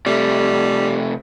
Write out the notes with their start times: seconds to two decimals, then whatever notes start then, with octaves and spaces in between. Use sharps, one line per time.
0.06 C3 G3 A3